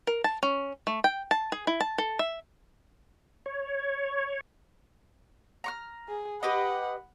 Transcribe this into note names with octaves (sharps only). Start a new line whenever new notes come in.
A#4
A5
C#4
A3
G5
A5
G#4
E4
A5
A4
E5
C#5
A#5 C#6 F6
G#4
G4 B4 D#5 F#5 B5